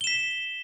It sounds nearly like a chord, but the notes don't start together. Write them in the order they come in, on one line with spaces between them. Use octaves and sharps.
G7 E7 B6